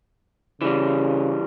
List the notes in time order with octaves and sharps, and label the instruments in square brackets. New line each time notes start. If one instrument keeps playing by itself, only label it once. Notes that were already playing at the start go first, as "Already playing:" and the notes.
[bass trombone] C#3 [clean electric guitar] E3 G3